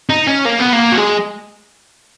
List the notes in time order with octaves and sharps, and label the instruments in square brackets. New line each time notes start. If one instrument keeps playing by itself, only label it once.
[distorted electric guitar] D#4
C#4
A#3
B3
A#3
F#3
G#3